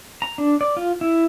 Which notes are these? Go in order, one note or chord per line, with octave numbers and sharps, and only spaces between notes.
A#5
D4
D5
F4
E4